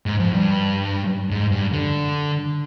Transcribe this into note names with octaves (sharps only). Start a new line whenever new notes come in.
G#2
F2
G2
G#2
G2
D3